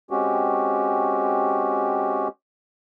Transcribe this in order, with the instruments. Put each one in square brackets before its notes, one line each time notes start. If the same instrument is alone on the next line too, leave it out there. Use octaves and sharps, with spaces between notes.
[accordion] G#3 C4 C#4 F#4 G4